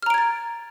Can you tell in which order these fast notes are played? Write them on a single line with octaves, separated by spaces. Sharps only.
F6 A#5 D7 G#6 A6